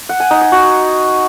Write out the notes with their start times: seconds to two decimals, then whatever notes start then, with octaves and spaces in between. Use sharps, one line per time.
0.09 F#5
0.20 G#5
0.31 D#4
0.41 D#5
0.52 F#4